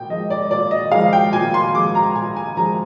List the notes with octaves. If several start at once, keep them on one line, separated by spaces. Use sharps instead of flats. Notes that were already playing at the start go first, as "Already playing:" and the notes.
Already playing: A#2 G5
F3 G#3 D#5
D5
A#2 D5
D#5
F3 G#3 F5
G5
A#2 G#5
C6
F3 G#3 D6
A#5
A#2 G#5
G#5
F3 G#3 A#5